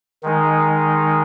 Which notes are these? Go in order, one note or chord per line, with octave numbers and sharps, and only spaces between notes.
D#3 G#3 D#4